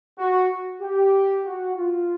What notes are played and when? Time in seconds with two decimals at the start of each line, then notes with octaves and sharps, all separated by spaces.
0.19 F#4
0.81 G4
1.45 F#4
1.76 F4